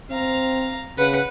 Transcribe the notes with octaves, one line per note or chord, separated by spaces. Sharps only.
C4 F5 A#5
C#3 B4 F#5